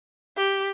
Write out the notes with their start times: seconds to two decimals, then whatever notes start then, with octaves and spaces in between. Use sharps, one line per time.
0.37 G4